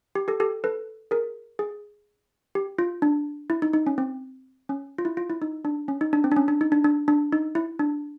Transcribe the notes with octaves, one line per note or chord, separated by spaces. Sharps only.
G4
G4 A4
G4 A4
A4 B4
G#4 A#4
G#4
G4
F4
D4
E4
D#4
D#4
C#4
C4
C#4
F4
E4
F4
E4
D#4
D4
C#4
D#4
D4
C4
D4
C#4
D4
D#4
D4
D4
D4
D#4
E4
D4